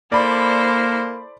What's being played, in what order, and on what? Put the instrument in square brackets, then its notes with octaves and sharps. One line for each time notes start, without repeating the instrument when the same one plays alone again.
[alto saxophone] A#3 [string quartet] E4 A4 C5 [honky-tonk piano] D5 B5